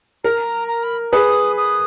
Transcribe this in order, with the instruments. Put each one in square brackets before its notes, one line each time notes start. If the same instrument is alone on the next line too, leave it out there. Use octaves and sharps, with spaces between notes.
[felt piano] A#4 [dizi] A#5
[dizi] A#5
B5
[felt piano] G#4 B4 [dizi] D#6
[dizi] D#6